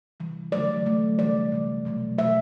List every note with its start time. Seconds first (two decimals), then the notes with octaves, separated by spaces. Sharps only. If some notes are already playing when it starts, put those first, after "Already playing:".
0.20 C3 E3 G3
0.52 D3 F#3 A3 D5
0.86 D3 F#3 A3
1.19 C3 E3 G3 D5
1.52 C3 E3 G3
1.85 B2 F#3 A3
2.18 B2 F#3 A3 E5